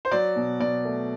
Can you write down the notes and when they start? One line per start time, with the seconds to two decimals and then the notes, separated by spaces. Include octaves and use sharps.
0.05 C5
0.11 F#3 D5
0.36 B2
0.60 B2 D5
0.85 A3